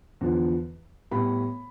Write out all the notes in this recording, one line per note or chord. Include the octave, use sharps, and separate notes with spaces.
E2 D3 F3
A2 G3 B3 B5